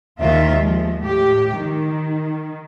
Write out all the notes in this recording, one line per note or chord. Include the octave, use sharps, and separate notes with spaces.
D#2 D#3 A#3 F4 E5
F3 G#3
A2 G4
D#3